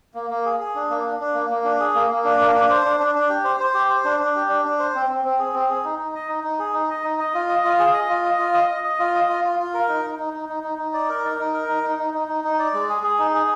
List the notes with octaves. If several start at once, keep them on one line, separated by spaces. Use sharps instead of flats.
A#3
A#3
G#4
G#4
D4
A#3
D4
D4
A#3
A#3
D4
G#4
A#3
A#3
D4
A#3
D4
C5
D4
D4
D4
G4
C5
C5
G4
C5
D4
D4
G4
D4
D4
C5
C4
C4
C4
G#4
C4
G#4
D#4
D#4
D#5
D#4
D#4
G#4
D#4
D#5
D#4
D#5
F4
D#5
F4
G#4
D#5
F4
D#5
F4
D#5
D#5
D#5
F4
D#5
F4
F4
F4
A#4
D#4
D#4
D#4
D#4
D#4
D#4
D#4
D5
A#4
D#4
D#4
A#4
D#4
D#4
D#4
D#4
D#4
D#4
D5
G#3
G#4
G#4
D#4
G#4